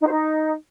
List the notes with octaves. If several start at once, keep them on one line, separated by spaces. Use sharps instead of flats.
D#4
C5
D#4